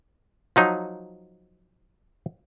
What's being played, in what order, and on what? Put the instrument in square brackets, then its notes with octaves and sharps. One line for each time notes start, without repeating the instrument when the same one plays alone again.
[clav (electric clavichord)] F3 F#3 D#4